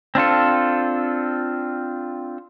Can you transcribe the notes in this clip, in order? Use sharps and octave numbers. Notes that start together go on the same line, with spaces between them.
C4 D4 F4 A4